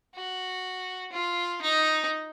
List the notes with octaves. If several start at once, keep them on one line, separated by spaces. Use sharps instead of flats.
F#4
F4
D#4